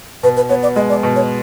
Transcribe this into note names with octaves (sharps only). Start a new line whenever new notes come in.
B2 B4
B4
B3 C#5
D5
G#3 D#5
D5
B2
C#5